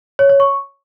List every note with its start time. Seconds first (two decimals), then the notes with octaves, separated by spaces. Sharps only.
0.19 C#5
0.29 C#5
0.40 C#6